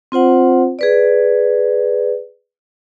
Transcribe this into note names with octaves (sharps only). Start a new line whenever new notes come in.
C4 F4 C5 F#5
G#4 B4 D5